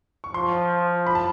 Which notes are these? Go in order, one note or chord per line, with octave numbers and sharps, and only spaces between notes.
C#6
F3 C6
B5
A5